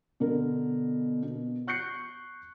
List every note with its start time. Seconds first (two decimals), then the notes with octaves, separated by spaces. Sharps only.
0.20 B2 D3 A#4
1.23 B2
1.67 C#6 F#6 G6 C7 C#7